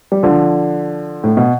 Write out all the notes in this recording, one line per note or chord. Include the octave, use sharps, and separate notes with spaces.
G3
D3 F3
A2
B2